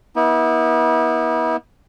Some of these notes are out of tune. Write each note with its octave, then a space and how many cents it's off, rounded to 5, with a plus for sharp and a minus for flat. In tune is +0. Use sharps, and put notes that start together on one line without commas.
B3 -35 E4 -40